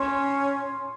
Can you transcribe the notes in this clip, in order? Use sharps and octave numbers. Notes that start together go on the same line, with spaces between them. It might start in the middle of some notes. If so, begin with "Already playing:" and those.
Already playing: C#4 C6